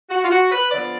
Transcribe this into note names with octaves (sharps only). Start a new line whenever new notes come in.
F#4
F4
F#4
B4
D3 F3 B3 D5